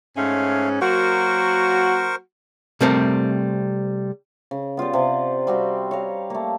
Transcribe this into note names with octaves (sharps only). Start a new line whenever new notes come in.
G#2 A3 C#4 F5
F#3 A#3 F#4 A#4 C5 C#6
C3 G3 A3 C4 A#4 C5
C#3
B3 F4 G4 D5
C3
G3 C4 F#4 G4
C#5 F5 A#5
A3 A#3